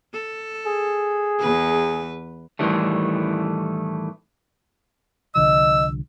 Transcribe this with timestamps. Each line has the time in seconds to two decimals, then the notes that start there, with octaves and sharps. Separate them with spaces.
0.13 A4
0.67 G#4
1.39 E2 B4
2.59 A2 D#3 E3 G3 A3
5.35 C2 D3 F3 D#5 E6